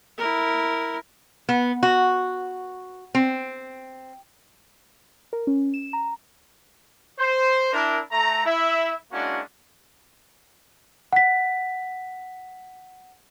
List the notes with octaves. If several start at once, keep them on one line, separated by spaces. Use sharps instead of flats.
E4 A#4
B3
F#4
C4
A#4
C#4
E7
A#5
C5
D4 E4 A#4
A3 A#5
E4 E5
G#3 A#3 C#4 D4 E4 F#4
F#5 B6